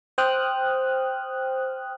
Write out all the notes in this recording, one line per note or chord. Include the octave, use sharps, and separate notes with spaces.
C5 G5 D#6 F6 F#6